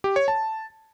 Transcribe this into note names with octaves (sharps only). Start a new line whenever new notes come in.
G4
C#5
A5